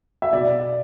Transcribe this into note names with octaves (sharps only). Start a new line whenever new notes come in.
E5
B2 D5